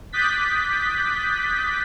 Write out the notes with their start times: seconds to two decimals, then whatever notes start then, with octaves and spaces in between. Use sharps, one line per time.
0.12 D6 D#6 F#6 G6 A6 B6